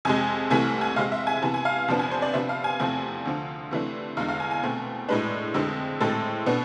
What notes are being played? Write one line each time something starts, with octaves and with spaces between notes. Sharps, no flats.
F2 C3 G#3 G#5
C2 C3 E3 A3 G#5
G#5
C3 G#3 C4 F5
E5
G#5
C3 E3 B3 A5
G#5
F5
F2 C3 F3 B3 D4 A5
G#5
C5
D5
C3 F3 B3 D4 E5
F5
G#5
E2 C3 F3 A3 C4 G#5
D2 D3 F3
C3 E3 A3 D4
E2 D3 G#3 F5
F5
G#5
G#5
B2 A3 C4
A2 G#3 D4 B4
F2 D3 G#3 C4
A2 G#3 C4 A4
B2 B3 D4